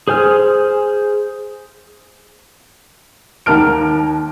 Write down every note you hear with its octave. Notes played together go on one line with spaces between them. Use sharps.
G#4 C5 G#5 F6
D#2 A#3 A#4 A5 F6 D7